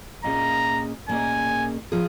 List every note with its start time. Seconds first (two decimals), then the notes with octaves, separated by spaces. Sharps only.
0.24 A#2 A#3 C#4 G#4 D#5 A#5
1.08 A#2 A#3 C#4 G#4 D#5 G#5
1.92 F3 F4 G#4